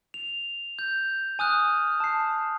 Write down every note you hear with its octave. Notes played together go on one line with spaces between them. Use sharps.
F7
G6
G#5 D#6 F6 F#6
A5 C7